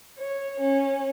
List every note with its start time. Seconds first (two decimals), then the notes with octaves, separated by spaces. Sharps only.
0.17 C#5
0.60 C#4